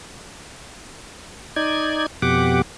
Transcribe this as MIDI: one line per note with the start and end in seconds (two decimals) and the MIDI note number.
1.56 2.06 63
1.56 2.06 74
1.56 2.06 92
2.22 2.62 41
2.22 2.62 47
2.22 2.62 67
2.22 2.62 78
2.22 2.62 86